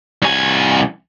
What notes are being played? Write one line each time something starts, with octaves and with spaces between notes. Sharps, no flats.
C2 G#5